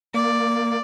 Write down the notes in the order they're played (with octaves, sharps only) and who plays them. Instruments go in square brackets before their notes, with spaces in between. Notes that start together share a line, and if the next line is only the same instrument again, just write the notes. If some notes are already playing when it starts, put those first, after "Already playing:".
[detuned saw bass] A#3 [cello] D5